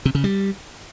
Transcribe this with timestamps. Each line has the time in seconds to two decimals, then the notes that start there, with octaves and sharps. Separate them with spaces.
0.05 C3
0.15 C#3
0.24 G3